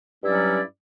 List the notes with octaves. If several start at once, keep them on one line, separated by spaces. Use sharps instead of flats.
G2 F#3 G3 C#4 E4 D5